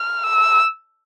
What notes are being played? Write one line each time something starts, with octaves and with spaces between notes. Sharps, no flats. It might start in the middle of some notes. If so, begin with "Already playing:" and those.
Already playing: F6
E6